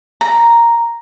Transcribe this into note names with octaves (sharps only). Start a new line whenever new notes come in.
A#5